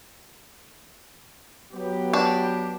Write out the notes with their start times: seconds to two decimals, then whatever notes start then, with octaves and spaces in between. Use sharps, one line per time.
1.73 F#3 B3 G4
2.13 D4